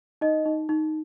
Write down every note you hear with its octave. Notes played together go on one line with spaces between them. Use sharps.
D#4 D#5
D#4
D#4